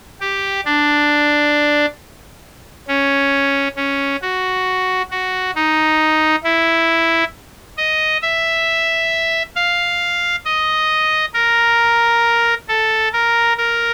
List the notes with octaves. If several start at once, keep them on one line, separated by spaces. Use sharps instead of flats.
G4
D4
C#4
C#4
F#4
F#4
D#4
E4
D#5
E5
F5
D#5
A#4
A4
A#4
A#4